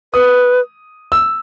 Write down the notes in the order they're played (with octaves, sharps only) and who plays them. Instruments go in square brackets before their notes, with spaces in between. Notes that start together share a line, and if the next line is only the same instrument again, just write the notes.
[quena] B4 [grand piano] D#6
[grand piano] E6